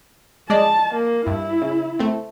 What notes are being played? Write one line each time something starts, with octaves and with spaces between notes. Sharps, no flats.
G#3 D5 D#5 A5
A#3
G2 E4
C#3
A3 C4